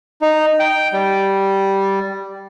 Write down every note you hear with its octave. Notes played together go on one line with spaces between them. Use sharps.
D#4
G5
G3